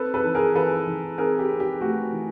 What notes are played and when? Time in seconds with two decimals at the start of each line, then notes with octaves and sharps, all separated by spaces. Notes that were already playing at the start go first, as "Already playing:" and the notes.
Already playing: C4 A4 B4
0.14 A4 B4
0.24 E3
0.35 G#4 A#4
0.55 E3 A4 B4
0.87 E3
1.18 C4 G#4 A#4
1.39 G4
1.50 C4
1.60 G4
1.81 A3 F#4
2.13 E3